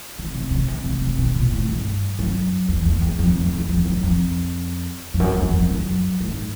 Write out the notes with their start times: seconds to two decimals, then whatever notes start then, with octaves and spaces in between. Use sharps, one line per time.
0.19 C#3
0.35 C3
0.51 C#3
0.68 C3
0.85 C3
1.01 C3
1.18 B2
1.35 A#2
1.52 A2
1.69 G2
2.19 F#2
2.68 E2
2.85 E2
3.02 E2
3.19 F2
3.37 F2
3.53 E2
3.69 F2
3.86 F#2
4.03 F2
5.14 F2
5.20 F#2
5.37 E2
5.53 F2
5.70 F#2
6.20 G#2